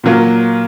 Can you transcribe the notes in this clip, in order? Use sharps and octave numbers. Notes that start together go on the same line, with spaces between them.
A#2 F#3 A#3 F4